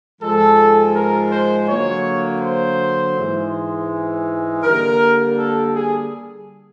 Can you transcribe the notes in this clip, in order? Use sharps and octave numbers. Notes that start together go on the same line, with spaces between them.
G#2 F3 G#3 A4
A#4
C5
D3 F#3 A#3 C#5
C5
G#2 E3 G#3
D3 G3 A#3 A#4
A4
G#4